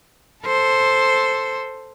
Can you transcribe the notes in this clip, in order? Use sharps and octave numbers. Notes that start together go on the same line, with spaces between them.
A4 C5